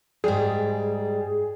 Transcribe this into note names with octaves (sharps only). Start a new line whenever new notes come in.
G#2 G3 G#4